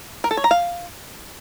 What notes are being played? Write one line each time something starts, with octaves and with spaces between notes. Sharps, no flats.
A#4
A4
C#5
A#5
F5